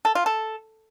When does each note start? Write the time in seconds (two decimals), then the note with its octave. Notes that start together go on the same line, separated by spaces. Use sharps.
0.05 A4
0.15 F4
0.26 A4